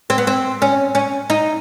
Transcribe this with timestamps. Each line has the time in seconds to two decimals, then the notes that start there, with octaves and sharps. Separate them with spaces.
0.10 C4
0.18 B3
0.27 C4
0.62 C#4
0.95 C#4
1.30 D#4